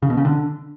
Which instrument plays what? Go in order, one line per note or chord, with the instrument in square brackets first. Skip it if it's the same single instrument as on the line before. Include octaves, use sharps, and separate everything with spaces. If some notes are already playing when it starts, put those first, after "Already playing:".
[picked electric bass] C#3
B2
C#3
D3